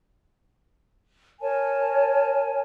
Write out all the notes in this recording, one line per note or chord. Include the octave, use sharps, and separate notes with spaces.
A#4 C#5 G#5 A5